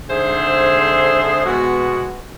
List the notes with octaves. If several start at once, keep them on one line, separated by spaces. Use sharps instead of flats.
G#2 D3 C4 G#4 C5 E5
B2 G#3 B3 F#4